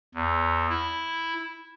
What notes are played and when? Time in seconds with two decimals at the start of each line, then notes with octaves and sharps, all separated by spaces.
0.14 E2
0.69 E4